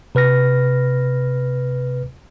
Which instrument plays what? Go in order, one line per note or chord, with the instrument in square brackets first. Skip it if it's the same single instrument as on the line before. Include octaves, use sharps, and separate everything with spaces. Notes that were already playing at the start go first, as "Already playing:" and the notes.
[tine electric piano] C3 B4 F6 A#6